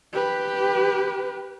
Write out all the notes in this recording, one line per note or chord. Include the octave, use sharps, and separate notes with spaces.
G4 B4